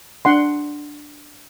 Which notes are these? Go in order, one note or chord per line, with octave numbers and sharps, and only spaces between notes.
D4 F#5 C6